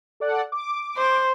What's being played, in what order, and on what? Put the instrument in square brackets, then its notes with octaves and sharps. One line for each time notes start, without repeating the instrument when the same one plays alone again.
[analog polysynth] A4 D5 F#5
D6
[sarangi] C5